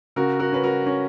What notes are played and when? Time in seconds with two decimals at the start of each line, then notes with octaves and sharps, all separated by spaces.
0.16 C#3 F#4 A#4
0.39 F#4 A#4
0.52 C#4 B4
0.63 F#4 A#4
0.86 C#4